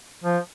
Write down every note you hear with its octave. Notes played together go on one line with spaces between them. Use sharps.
F3